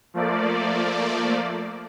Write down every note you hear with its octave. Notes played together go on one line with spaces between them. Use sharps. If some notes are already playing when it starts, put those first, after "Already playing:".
F3 A3 A#3 D5